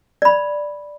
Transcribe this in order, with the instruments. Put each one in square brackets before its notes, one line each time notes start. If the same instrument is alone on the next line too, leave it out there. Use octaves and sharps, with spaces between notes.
[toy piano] D5 B5